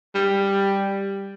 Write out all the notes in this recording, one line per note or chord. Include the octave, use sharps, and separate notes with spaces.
G3